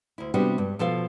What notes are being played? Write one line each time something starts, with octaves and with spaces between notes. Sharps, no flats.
D2 E4
C3 G3 B3 D4 F#4
G2
B2 F3 A4 F5